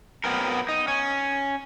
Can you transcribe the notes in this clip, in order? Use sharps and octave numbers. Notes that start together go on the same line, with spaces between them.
F#3 B3 C4 A#4
D#4
C#4